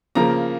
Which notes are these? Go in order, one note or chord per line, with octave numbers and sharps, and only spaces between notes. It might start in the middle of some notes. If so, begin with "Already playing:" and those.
C#3 F3 A#3 A#5